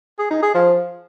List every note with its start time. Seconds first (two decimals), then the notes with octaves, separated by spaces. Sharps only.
0.19 G#4
0.31 D#4
0.43 G#4
0.54 F3